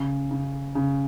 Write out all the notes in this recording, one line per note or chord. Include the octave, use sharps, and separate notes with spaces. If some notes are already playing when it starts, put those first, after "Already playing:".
Already playing: C#3
C#3
C#3